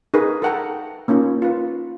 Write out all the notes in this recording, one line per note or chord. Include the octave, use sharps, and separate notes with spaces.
D#4 G#4 A#4 B4
A4 A#4 F#5 G5 A#5
A#3 C#4 D#4 F4
F4 B4